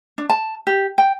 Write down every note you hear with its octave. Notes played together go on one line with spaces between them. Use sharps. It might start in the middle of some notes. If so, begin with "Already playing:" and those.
D4
A5
G4
G5